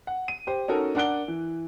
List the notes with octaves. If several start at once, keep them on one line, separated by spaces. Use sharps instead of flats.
F#5
D#7
G4 C5
C#4 D#4 F#4 A4 A#4
D4 A#4 F#5 F#6 D7 G7
E3